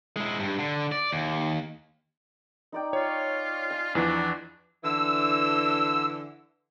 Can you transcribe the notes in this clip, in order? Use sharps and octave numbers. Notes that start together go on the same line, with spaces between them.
G#3 E4
G2
D3
D5
D#2
D#4 D5 G5
F4 C#5
G#5
E2 E3 F3 D4
D3 E3 E6